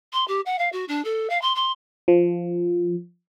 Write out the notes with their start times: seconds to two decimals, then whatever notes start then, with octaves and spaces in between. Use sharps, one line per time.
0.13 C6
0.28 G4
0.46 F#5
0.59 F5
0.72 F#4
0.88 D4
1.04 A4
1.30 F5
1.41 C6
1.55 C6
2.08 F3